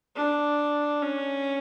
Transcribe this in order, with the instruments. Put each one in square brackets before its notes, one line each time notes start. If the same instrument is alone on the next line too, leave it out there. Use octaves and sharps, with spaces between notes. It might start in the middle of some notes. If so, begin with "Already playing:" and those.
[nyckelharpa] D4
C#4